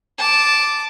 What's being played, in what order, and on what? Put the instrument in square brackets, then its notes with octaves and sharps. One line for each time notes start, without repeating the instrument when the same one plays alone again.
[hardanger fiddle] A5 D6